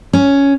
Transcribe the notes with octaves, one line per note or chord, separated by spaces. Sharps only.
C#4